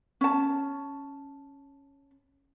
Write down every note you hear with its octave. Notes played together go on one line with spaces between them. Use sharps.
C#4 A5